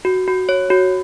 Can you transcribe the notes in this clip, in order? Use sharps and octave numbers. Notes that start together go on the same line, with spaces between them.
F#4
F#4
C#5
F#4